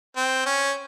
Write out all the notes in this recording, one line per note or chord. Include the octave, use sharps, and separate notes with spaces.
C4
C#4